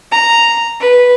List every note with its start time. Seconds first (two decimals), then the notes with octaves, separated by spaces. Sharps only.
0.11 A#5
0.81 B4